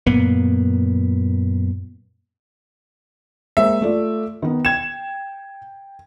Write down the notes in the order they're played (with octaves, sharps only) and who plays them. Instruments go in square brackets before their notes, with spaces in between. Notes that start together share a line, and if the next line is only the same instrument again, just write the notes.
[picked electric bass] F#2 A#2 A#3 B3
[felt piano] G#3 A#3 C5 [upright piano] E5
[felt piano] A3 F4 D5
D#3 B3
[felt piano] G5 [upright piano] G#6 E7